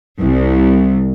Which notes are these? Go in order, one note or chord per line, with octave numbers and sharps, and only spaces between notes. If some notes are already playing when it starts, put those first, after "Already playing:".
C2